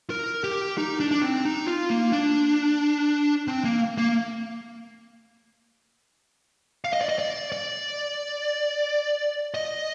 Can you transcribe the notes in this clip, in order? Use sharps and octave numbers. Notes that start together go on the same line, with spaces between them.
A#4
G4
D#4
D4
D4
C4
D#4
F4
A#3
D4
C4
A#3
A#3
F5
D#5
D5
D#5
D5
D5
D#5